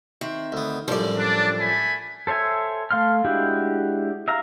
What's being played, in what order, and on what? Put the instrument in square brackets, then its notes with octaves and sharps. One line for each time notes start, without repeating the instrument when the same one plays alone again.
[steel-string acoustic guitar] D#3 C4 E5
[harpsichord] D2 B3
[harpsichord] F#2 A2 G3 [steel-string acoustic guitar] F3 D5
[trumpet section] D4
A3 G#5 B5
[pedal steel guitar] A4 C5 C#5 E5 G#5
A3 F5 C6 F6
G#3 D4 E4 F#4 G4
E5 F5 A#5